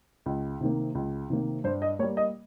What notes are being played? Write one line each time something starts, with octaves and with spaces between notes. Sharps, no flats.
C#2
C3 D#3 A#3
C#2
C3 D#3 A#3
G2 C5
D#5
G3 A#3 C#5
D#5